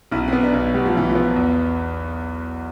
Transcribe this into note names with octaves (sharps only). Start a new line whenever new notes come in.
B1 E4
C4
B3
D4
B1
B2 G3
F3
B1 E3
F3
B3
E2